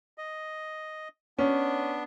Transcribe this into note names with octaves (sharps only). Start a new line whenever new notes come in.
D#5
B3 C#4 D4